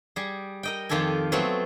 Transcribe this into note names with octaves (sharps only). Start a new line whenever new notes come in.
G3 G#4
A#4 D#5 G5
F2 D#3 F4 G4 A4 G#5
F#3 A3 B3 C4 F4